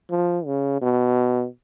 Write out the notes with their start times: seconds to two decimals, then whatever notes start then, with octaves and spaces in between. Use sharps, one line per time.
0.11 F3
0.46 C#3
0.82 B2